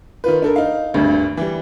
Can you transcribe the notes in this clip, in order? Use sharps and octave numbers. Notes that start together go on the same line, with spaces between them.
D#3 F4 B4
D4 A4 A#4
D#4 F5
G#1 D2 G2 D3
E3 G3